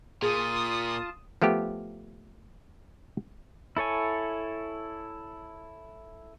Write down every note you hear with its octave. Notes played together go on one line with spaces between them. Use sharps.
A#2 F4 G#4 A5 D#6
F3 A3 B3 G4
E4 A4 C#5 G#5